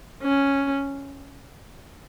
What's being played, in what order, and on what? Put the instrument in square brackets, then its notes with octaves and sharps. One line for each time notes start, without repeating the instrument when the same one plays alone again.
[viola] C#4